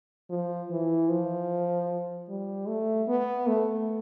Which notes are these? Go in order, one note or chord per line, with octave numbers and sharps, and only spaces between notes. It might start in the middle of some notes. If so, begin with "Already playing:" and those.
F3
E3
F3
G3
A3
B3
A3